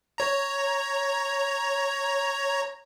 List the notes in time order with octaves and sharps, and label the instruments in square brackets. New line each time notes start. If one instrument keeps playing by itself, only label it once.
[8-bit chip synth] C#5 A#5